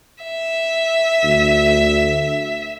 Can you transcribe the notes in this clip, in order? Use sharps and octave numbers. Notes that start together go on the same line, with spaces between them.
E5
D2